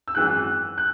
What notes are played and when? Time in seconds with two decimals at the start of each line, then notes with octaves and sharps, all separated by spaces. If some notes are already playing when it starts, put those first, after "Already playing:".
0.08 E6
0.15 G#1 F#2 E3 G#3 F#6
0.78 F#6